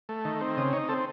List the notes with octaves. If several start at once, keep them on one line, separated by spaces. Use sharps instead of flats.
A3
D#3
C4
C#3 D#5
D#4 C#5
C4 A4